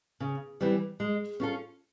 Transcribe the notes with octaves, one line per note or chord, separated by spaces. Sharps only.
C#3
E3 G3 C4
G#3
C#4 F4 A4